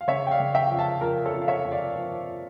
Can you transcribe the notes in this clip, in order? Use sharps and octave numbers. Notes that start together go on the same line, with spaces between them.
F5
C#3 C#5 E5
G5
D5 F5
C#3
E5 G5
F2
F5 A5
F2 A#4
A4 C#5
F2
F5
C#5 E5
F2
D5 F5
F3